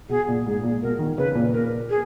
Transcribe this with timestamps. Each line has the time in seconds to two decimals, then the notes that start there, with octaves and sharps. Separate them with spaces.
0.09 B2 G#4
0.28 A#2
0.46 G#2 G#4
0.63 A#2
0.82 B2 A#4
0.99 D#3
1.18 C#3 B4
1.35 A#2
1.53 A#4
1.90 G#4